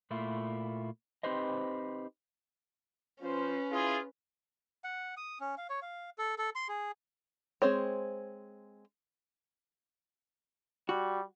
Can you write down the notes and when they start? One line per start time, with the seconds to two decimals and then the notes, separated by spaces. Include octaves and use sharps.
0.10 A#2 A3 A#3 E4 F4
1.23 C4 D#4 G4 B4 C5 D#5
3.21 F3 C#4 F4 B4 C5
3.71 E4 F4 G#4
4.84 F#5
5.17 D#6
5.40 C#4
5.58 F5
5.70 C#5
5.82 F5
6.18 A4
6.38 A4
6.55 C6
6.68 G#4
7.62 G#3 C4 C5 C#5
10.89 G3 F#4